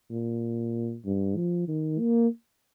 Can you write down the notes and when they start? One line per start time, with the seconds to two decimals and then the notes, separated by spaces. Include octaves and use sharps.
0.11 A#2
1.05 G2
1.37 F3
1.68 D#3
1.99 A#3